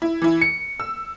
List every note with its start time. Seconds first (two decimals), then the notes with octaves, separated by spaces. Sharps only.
0.02 E4
0.22 E3 E4
0.41 C#7
0.80 E6